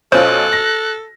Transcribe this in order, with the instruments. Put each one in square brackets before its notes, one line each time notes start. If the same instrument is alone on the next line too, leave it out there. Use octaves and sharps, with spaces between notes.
[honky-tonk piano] B1 C#4 F4 [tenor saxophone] A4 [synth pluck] C5 [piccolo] F#6
[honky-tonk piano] A#6